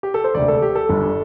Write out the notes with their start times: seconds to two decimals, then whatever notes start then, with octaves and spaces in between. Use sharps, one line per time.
0.03 G4
0.14 A4
0.24 C5
0.34 E1 D2 C3 D5
0.48 A4
0.62 G4
0.75 A4
0.89 G1 G2 G3 D4